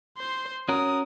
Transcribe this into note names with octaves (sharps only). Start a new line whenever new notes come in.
C5 C6
C#4 F#4 A#4 D#6